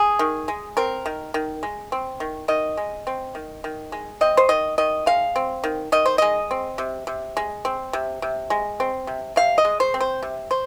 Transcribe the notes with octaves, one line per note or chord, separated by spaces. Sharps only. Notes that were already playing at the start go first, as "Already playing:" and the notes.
Already playing: G#4
D#3
G#3
C4 A#4
D#3
D#3
G#3
C4
D#3
D#3 D#5
G#3
C4
D#3
D#3
G#3
C4 D#5
C5
D#3 D#5
D#3 D#5
G#3 F5
C4
D#3
D#3 D#5
C5
G#3 D#5
C4
C3
C3
G#3
C4
C3
C3
G#3
C4
C3
C3 F5
D#5
G#3
C5
C4
C5
C3
C5